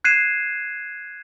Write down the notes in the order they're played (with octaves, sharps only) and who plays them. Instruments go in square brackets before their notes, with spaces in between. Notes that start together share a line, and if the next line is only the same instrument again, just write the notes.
[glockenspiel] F#6 G#6 C7 D#7 E7